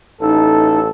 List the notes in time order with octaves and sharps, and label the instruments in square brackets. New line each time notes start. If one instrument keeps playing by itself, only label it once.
[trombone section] A1 A4 [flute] D#4